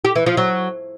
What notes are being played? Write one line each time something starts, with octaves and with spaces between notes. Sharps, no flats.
G4
E3
F3
F#3